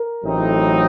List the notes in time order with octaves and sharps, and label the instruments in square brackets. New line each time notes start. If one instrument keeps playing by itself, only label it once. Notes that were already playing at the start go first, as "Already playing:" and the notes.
Already playing: [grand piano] A#4
[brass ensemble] A1 A2 F#3 C4 D#4